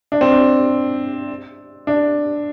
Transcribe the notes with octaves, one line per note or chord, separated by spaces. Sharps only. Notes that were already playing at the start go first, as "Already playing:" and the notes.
D4
C4
D4
D4